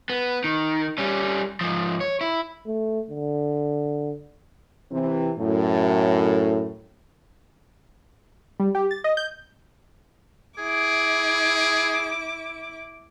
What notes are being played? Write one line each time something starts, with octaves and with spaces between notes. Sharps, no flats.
B3
D#3
G3 C#4
G#2 F3
C#5
E4
A3
D3
C3 E3 C4
F#2 A2
G3
G4
A6
D#5
G6
E4 G#4 D6